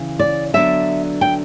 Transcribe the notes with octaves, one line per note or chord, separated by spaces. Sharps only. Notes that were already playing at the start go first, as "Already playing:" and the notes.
Already playing: C#3 E3
D5
D3 F#3 B3 D4 E5
G5